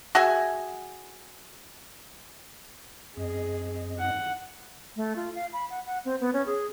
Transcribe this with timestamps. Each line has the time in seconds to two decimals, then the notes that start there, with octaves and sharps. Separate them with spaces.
0.15 F#4 G#4 E5 G#5
3.17 F#2 C4 G#4 D#5
3.99 F#5
4.96 A3
5.16 F4
5.35 F5
5.53 B5
5.70 F#5
5.86 F#5
6.05 C4
6.20 B3
6.33 C#4
6.46 G#4